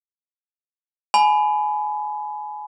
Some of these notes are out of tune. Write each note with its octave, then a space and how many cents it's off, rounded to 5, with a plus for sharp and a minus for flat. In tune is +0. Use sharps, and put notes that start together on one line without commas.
G#5 +25 B5 +15